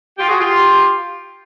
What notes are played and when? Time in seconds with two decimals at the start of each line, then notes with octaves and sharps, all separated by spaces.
0.18 F4 G4
0.28 F#4 G#4
0.38 F4 G4